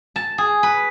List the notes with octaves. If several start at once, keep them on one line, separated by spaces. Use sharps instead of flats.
A5
G#4
B4